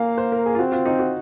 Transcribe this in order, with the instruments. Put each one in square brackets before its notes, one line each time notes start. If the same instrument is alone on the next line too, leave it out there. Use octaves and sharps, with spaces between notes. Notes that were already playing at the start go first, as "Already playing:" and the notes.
Already playing: [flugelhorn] A#3 [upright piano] F5 G#5
[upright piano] C5
A#4
G#4
F4
[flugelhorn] C4 [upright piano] F#4
[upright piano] F4
D#4
F#4